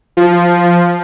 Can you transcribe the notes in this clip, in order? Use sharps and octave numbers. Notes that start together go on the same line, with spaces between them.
F3